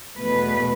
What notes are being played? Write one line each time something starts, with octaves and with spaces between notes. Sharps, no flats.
E2 B2 A3 B4